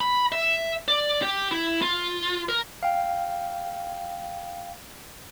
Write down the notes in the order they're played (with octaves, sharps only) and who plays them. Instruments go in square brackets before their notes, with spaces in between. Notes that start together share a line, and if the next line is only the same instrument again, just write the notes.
[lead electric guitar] B5
E5
D5
G4
E4
F4
A#4
[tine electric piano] F5 G5